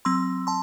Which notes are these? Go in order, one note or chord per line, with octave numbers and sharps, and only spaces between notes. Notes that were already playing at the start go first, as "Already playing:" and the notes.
F#3 C4 C6 E6
A5 C6